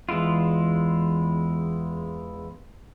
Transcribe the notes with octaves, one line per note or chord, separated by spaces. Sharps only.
E2 G#3 E4 F4